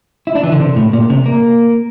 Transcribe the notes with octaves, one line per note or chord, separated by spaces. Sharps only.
E4
D4
E3
D3
C3
A2
A#2
C3
A#3